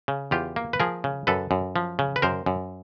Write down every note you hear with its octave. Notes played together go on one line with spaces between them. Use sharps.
C#3
E2 F4 G4
A#3
B4
F3 G#4 A#4
C#3
F#2 A4 B4
F#2
F3
C#3
B4
F#2 A#4 C5
F#2